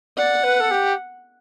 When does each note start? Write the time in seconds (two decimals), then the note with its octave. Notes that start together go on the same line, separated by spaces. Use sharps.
0.17 D5 F#5
0.43 B4
0.60 A4
0.70 G4